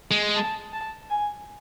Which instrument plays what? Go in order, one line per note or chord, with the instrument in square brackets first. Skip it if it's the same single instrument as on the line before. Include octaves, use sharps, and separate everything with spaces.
[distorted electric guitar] G#3
[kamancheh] A5
A5
G#5